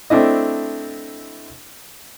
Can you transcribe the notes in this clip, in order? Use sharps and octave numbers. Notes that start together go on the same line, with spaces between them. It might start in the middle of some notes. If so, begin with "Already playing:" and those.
A3 C4 D4 E4 D#5